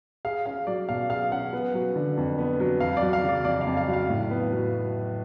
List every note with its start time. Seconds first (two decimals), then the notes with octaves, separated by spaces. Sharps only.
0.25 G#4 F5
0.46 C#4 F5
0.67 F#3 D5
0.89 B2 F5
1.09 G#4 F5
1.31 C#4 F#5
1.53 B3
1.74 F#3
1.96 D3
2.17 F2
2.38 B3
2.60 F#3
2.80 F2 F5
2.97 D5
3.02 F#3
3.13 F5
3.23 C#3
3.29 D5
3.45 F2 D5
3.61 F5
3.67 F2
3.77 F5
3.88 F#3
3.93 F5
4.09 A2
4.30 B3
4.52 F#3